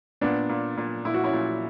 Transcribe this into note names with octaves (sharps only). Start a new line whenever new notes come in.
A#2 B3 D4
A#2
A#2
A#2 E4
F#4
C#4 E4
A#2